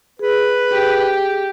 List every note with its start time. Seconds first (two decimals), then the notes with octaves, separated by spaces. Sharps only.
0.19 G#4 B4
0.71 G4